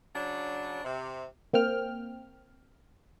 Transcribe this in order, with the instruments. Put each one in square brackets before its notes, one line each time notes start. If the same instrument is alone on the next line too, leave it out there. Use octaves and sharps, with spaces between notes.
[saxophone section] C#3 F#3 D4
C3
[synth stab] A#3 C4 G5 F6